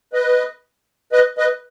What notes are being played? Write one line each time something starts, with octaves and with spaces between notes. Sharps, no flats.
B4 D#5
B4 D#5
B4 D#5